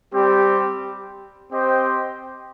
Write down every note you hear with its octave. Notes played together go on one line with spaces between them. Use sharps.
G3 C4 G4
C4 G4 C5 D#5 G5